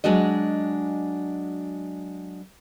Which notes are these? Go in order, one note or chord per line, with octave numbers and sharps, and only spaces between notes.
F#3 G#3 D4 F#4 D#5